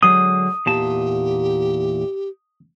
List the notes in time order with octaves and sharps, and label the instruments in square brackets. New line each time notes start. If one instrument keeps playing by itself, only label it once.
[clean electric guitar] D3 F#3 G#3 [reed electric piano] D#6
[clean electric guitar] E2 A#2 A5 [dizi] G4